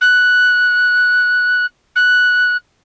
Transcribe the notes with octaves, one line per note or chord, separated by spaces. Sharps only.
F#6
F#6